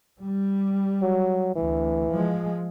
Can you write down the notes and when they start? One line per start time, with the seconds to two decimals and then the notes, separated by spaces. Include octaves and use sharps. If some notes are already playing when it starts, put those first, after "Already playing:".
0.21 G3
1.02 F#3
1.55 D2 E3
2.11 F3 G#3